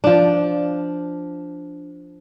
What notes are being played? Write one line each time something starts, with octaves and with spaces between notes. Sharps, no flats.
F3 D4